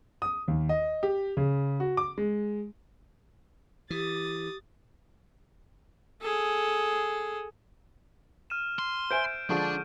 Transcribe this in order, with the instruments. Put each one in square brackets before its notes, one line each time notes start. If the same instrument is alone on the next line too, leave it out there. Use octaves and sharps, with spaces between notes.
[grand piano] D#6
D#2
D#5
G4
C#3
F#4
D6
G#3
[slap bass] E3 [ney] G4 [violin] D#6 A6
[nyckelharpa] G#4 A4
[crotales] F6 D#7 E7
[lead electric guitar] C6
[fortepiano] C5 E5 G#5 [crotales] G6 D7
[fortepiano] D3 F3 G#3 [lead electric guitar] D4 [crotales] C#6